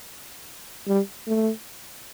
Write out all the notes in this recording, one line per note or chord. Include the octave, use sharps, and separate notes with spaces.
G3
A3